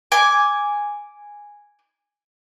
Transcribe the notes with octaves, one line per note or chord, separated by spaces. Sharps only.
G#5 D6